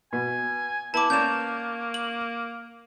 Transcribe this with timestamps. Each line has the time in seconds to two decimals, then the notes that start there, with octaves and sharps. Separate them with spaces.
0.13 B2 G#5
0.94 B3 E4 A5 D6
1.10 A#3 C#4 D5 A#5 G6 E7
1.94 F#7